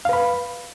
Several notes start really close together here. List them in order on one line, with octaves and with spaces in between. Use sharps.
F5 B4 B5